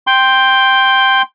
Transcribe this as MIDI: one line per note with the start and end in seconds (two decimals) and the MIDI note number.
0.07 1.22 79
0.07 1.22 84